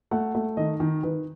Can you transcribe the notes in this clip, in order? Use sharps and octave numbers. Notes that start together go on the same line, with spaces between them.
A3 F#5
A3
D#3 D#5
D#3
D#3 B4